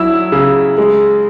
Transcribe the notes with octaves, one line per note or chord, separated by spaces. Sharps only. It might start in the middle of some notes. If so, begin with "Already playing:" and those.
Already playing: F#3 E4 E6
C#3
G#3